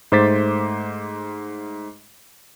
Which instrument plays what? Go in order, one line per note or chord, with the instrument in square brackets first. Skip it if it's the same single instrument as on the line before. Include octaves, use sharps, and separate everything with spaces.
[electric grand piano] G#2 A3 C5 D6 A6 B6